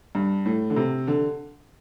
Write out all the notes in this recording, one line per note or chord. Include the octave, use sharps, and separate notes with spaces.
G2
A2
D3
C3
D3